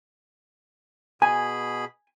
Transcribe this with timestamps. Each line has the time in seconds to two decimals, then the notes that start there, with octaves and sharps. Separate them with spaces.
1.22 B2 G#4 G#5 B5